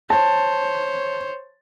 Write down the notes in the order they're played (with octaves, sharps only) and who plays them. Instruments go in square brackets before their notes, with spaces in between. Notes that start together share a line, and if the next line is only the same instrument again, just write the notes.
[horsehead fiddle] C5 C#5 [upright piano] A5